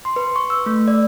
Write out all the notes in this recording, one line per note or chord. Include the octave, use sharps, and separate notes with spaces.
C6
B4
C#6
E6
A3
D5